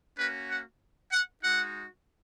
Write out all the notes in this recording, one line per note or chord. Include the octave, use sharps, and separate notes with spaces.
A#3 C#4 F#4 B4
F#5
F#5
G#3 D#4 F#4 F#5